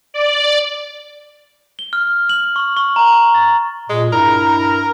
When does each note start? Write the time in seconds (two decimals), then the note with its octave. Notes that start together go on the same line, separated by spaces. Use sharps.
0.14 D5
1.79 G7
1.93 F6
2.29 F#7
2.56 C#6
2.77 C#6
2.96 A#5
3.13 C#6
3.35 A6
3.90 A#2 G#3
4.13 G2 E4 A#4 A#5